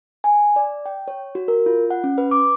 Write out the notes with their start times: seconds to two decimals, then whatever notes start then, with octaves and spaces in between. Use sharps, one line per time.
0.24 G#5
0.56 D5
0.86 G5
1.08 C#5
1.35 F#4
1.48 A#4
1.66 F4
1.90 F#5
2.04 C#4
2.18 B4
2.31 D6